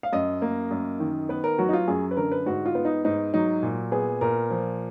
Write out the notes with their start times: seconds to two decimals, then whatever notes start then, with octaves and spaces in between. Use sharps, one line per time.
0.03 F5
0.13 F#2 D#5
0.42 A#3
0.71 F#2
1.00 D#3
1.29 B3 B4
1.44 A#4
1.58 F#3 F#4
1.69 D#4
1.73 F4
1.88 F#2 G#4
2.11 B4
2.17 D3 A#4
2.32 B4
2.46 G#2 F#4
2.66 F4
2.75 B3
2.85 D#4
3.05 G#2 D#4
3.34 F#3 D#4
3.63 A#2
3.92 B3 G#4
4.21 A#2 A#4
4.50 F3